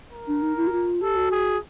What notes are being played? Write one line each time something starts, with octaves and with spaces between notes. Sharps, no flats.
A#4
D4
D#4
E4
F#4
F4
G4 A4
F#4
G#4